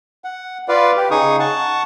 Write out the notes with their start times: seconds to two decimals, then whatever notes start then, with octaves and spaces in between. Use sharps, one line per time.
0.24 F#5
0.68 F4 B4 D5 F5
0.97 G4
1.11 C#3 D#4 G#4 C#6 D#6
1.40 F#5 A5 C#6